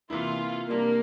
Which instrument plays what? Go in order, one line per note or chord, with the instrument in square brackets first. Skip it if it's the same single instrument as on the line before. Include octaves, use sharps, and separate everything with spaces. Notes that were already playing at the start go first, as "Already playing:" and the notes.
[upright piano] C3 E3 A#3 E4 [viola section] F4
[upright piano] C3 G3 D4 [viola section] A#3